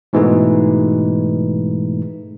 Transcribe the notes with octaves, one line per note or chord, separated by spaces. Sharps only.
G#2 B2 E3 G#3 A3 D#4